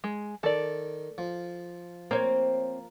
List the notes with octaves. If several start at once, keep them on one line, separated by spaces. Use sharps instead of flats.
G#3
D#3 A4 D5
F3
A#3 C4 C#5